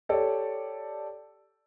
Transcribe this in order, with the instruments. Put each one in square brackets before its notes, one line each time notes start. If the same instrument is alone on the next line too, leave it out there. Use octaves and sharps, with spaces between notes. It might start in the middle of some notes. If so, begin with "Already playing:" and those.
[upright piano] G4 A4 C#5 D5